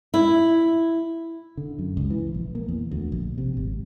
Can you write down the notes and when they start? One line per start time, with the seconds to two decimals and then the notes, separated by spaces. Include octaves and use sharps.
0.14 E4
1.57 D3
1.79 F#2
1.97 C#2
2.10 E3
2.34 A#1
2.55 A#3
2.68 E2
2.91 D2
3.12 A#1
3.38 C3
3.57 G#1